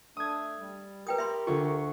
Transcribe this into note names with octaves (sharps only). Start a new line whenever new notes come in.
A3 D4 D#6 G#6
G3
G4 A#4 B4 G5 D#6
E5 B5 C6
D2 F4 C#6